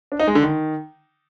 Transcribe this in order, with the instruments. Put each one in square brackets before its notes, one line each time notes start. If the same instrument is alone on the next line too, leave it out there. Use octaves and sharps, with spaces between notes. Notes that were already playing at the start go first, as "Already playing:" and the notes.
[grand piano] D4
D#4
G#3
D3
D#3